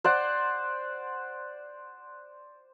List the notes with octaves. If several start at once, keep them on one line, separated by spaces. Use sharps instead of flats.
C5 D5 F#5